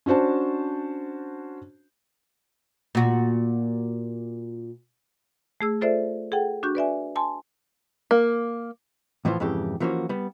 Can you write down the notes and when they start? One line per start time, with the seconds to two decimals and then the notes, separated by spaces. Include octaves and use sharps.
0.06 C#4 D4 F#4 C5 A5
2.95 A#2 F#4
5.61 A3 G#4 E6
5.81 F4 A4 C5 D5 E5
6.32 G#4 A4 F#5 G5
6.63 D4 F#4 C#6 G6
6.75 B4 D5 E5 G#5
7.16 G#5 A5 C6
8.11 A#3
9.25 A2 E3 F3 B3 F4
9.40 F2 G#2 C#3 E3 G4
9.80 E3 F3 A#3 C#4 F#4
10.09 G3 B3